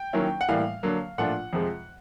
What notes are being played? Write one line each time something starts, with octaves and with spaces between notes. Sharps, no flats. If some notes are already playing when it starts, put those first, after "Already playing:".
Already playing: G5
D#3 F#3 A#3 C#4 E4
F#5
A2 E3 G3 A#3 F5
D3 F#3 A#3
A#2 F3 A3 D4 F4 F#5
F2 C3 F3 G#3